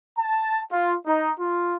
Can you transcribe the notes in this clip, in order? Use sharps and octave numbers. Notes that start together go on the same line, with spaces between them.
A5
F4
D#4
F4